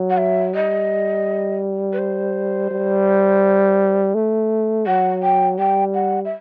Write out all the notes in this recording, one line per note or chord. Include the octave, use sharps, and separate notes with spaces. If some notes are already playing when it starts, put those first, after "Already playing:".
Already playing: F#3
F#5
E5
G3 D#5
B4
C5
G3
A3
F#3 F#5
G5
G3 G5
F#5
E5